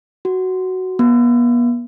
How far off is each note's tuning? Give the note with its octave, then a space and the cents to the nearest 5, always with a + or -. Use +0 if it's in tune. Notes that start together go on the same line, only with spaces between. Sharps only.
F#4 +10
B3 -45